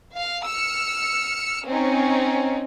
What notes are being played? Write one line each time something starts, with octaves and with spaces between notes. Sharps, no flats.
F5
E6 F6 C#7
C4 C#4 D#4